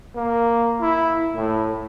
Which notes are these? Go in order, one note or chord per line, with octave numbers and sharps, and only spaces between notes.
A#3
E4
A2